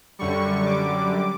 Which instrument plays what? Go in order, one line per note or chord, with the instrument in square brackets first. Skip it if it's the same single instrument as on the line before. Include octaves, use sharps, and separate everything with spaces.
[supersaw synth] F#2 D3 G3 C#6
D6